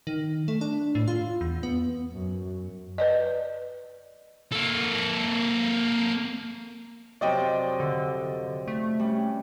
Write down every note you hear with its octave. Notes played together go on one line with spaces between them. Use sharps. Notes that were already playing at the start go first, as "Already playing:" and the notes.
D#3
A3
D4
A2
F4
E2
B3
F#2
B4 D5 D#5
A#3 A4
F2 C3 F#3 D5 D#5 G5
D3
A3
G3 C#4